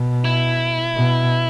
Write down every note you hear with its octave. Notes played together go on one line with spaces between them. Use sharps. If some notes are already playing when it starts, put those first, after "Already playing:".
Already playing: B2
E4
B2